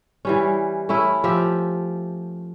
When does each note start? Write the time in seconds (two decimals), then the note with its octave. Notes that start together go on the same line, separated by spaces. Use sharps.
0.25 E3 G3 C#4
0.89 A3 C#4 E4
1.24 F3 G4 E5